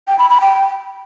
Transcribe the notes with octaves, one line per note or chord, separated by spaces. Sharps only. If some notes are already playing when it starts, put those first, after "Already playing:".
G5
B5
B5
G5